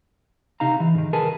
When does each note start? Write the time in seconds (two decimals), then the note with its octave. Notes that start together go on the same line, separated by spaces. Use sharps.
0.60 C3 D#4 F5 A#5
0.80 E3
0.95 G#2 D#3
1.13 C2 G#4 A#4 B4 G#5 A5